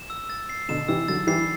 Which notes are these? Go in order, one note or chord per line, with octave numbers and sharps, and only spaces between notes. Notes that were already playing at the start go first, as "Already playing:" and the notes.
Already playing: E7
E6
A6
C7
B2 D3 E7
C3 E3 E6
D3 F#3 A6
E3 G3 C7